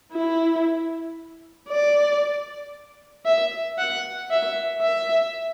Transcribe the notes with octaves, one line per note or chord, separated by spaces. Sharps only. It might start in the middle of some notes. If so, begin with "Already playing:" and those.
E4
D5
E5
F#5
E5
E5